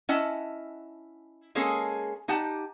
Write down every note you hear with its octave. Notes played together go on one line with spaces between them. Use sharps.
C#4 E4 D#5 F#5 A5
G#3 A#3 C#4 G#4 A4
D#4 G4 F#5 A5